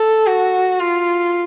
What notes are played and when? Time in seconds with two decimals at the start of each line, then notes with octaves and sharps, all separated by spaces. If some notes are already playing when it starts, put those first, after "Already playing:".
Already playing: A4
0.26 F#4
0.80 F4